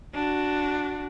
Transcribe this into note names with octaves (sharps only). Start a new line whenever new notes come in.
D4 F#4